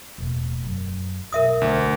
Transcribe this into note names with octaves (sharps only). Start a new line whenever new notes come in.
E1 A2
F#2
B1 G#2 A#4 E5 D#6
D2